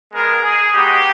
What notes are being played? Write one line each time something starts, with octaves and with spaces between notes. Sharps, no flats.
G#3 B3 D4 G#4 A#4
G#4
G#3 B3 D#4 F#4 G4